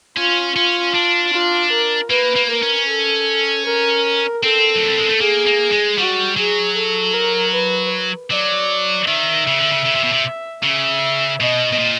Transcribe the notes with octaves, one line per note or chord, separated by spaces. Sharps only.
C#4 F4
C#4 F4
D4
F4
A#4
A#3 B4
A#3
A#4
C#4
A4
A#4
C4 A4
F#3
G3
G#3
A3
A#3 G#4
A#3
G#3
G3 F#4
F#3 G#4
A4
A#4
B4
F#3 D5
D#3 E5
C#3
D3
C#3
C#3
C3
B2
C3
C#3 E5
B2 D#5
B2
A#2